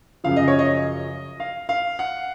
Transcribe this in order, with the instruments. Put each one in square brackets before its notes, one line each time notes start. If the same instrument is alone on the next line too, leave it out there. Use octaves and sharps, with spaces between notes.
[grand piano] F#2 C#3 F3 F5
D#5
C#5
D#5
F5
F5
F#5